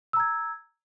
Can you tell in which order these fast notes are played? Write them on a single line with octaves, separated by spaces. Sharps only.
E6 A#5 G#6